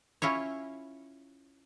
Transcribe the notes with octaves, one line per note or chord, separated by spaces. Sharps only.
C#4 E4 F4 C#5